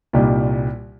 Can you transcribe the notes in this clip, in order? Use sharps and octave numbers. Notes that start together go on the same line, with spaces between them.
C2 A#2 G3 D#4 G4